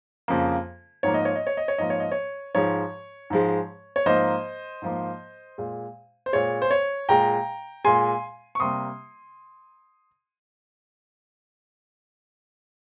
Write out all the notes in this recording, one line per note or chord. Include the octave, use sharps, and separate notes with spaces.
F2 C#3 F3 A#3
G#2 F3 A#3 C#5
D#5
C#5
D#5
C#5
D#5
C#5
G#2 F3 A#3 D#5
C#5
D#5
C#5
G#2 F3 G#3 C#5
G#2 F3 G#3
C#5
G#2 F3 A#3 C5 D#5
G#2 F3 A#3
A#2 G#3
C5
A#2 G#3 C#5
C5
C#5
A#2 G#3 G5 A#5
A#2 G#3 G#5 C6
C#6
C3 G3 A#3 C6 D#6